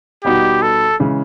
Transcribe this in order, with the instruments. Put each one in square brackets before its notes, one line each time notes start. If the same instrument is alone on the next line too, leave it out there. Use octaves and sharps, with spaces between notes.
[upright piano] B2 G3 B3 D#4 F#4 [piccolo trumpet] G4
[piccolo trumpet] A4
[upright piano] C#3 E3 G#3 C#4